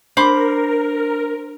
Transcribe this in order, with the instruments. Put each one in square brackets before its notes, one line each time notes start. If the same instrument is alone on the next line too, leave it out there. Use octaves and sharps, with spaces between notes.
[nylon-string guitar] D4 [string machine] A#4 [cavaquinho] C5 B5 D6